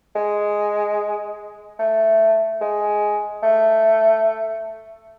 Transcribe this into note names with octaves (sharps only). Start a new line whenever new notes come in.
G#3
A3
G#3
A3